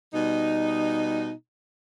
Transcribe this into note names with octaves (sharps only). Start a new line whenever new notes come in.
B2 G3 D#4